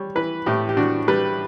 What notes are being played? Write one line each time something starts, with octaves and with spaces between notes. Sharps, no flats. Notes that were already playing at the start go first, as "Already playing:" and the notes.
Already playing: G3 C#5
E3 B4
A2 G4
G4
D4 F#4
G3 B4